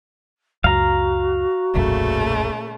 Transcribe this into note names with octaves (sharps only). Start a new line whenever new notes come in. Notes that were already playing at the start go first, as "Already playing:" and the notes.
C#2 F#2 F#4 F5 A#5
E1 B1 F#2 A#2 C#3 A3